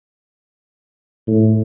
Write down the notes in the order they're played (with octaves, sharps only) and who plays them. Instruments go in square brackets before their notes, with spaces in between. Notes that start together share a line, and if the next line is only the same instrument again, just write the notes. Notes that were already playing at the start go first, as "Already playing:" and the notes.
[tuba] A2